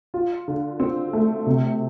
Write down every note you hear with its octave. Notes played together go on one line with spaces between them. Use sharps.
F4
D3
C4
A3
C3